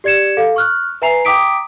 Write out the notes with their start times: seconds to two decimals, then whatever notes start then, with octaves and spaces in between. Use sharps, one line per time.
0.04 G4 D5 G#6 C#7 E7
0.37 A4 F5
0.56 C#6 F6 F#6
1.02 B4 E5 G#5 A#5 C7 F7
1.25 G5 A#5 D6 D#6 B6 D7